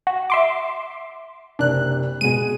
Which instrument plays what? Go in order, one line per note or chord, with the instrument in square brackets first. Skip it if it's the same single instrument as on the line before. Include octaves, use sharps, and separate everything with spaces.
[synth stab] F#4
E5 C6 D6
[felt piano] F#1 C3 [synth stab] D4 F#6
[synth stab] B2 D#7 [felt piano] G#3 G#4